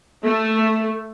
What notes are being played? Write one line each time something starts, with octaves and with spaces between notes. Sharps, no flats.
A3